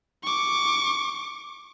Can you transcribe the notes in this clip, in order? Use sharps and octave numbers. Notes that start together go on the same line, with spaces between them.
C#6 D6